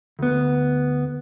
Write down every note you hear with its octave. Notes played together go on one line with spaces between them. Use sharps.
D2 B3